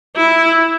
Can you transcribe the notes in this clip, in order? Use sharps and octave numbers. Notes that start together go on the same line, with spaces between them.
E4